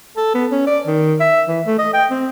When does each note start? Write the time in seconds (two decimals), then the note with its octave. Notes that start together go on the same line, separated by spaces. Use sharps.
0.17 A4
0.34 B3
0.51 C#4
0.66 D5
0.87 D#3
1.20 E5
1.47 E3
1.66 A3
1.79 D#5
1.93 G5
2.10 C4